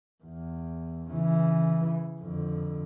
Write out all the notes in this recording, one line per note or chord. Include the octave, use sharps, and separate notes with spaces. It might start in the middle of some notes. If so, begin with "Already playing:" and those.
E2
C#3 E3
F2 D3